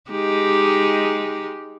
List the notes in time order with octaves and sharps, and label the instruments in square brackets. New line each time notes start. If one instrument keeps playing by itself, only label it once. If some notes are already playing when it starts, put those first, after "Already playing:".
[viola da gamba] G#3 D#4 G4